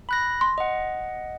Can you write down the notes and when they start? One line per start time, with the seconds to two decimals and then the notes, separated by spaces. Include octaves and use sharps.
0.09 B5 F#6 A#6
0.41 C6
0.58 D#5 F#5